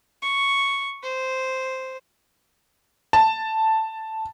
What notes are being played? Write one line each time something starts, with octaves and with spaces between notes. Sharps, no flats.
C#6
C5
A5